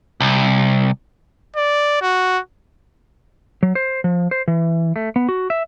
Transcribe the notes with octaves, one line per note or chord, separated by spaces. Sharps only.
C2
D5
F#4
F#3
C5
F3
C5
E3
A3
B3
F#4
E5